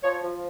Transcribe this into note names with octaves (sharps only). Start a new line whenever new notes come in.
F3 C#5
F3